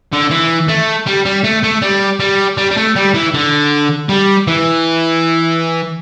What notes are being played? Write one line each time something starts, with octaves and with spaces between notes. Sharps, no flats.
D3
E3
A3
G3
G3
A3
A3
G3
G3
G3
G3
A3
G3
E3
D3
G3
E3